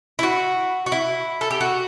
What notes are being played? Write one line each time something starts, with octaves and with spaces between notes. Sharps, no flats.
E4
F#4
F#4
E4
A4
G4
F#4